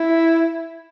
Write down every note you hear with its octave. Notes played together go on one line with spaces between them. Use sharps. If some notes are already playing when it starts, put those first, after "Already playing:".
Already playing: E4